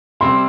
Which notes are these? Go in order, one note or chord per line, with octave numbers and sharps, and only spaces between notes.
C3 G3 C4 E4 C6